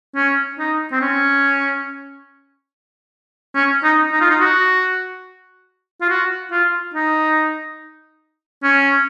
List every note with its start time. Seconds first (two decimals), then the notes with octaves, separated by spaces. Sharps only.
0.16 C#4
0.59 D#4
0.92 C4
1.01 C#4
3.55 C#4
3.84 D#4
4.12 D#4
4.21 F4
4.30 D#4
4.40 F#4
6.01 F4
6.10 F#4
6.52 F4
6.94 D#4
8.63 C#4